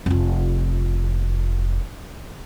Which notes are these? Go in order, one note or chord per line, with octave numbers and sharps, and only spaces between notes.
F1 F4